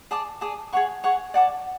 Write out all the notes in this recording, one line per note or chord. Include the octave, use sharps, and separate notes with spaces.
G#4 D5 A5 D6
G#4 D5 A5 D6
G#4 C#5 F#5 C#6
G#4 C#5 F#5 C#6
D5 F#5 A5 D6